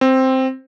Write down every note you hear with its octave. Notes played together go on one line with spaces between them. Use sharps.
C4